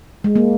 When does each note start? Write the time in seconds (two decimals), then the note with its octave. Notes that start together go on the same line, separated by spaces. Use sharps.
0.24 G#3
0.36 A#3